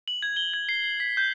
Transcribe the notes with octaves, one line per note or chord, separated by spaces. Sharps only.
F#7
G#6
G7
G#6
C7
C7
B6
G6